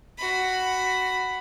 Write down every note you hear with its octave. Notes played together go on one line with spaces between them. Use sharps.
F#4 B5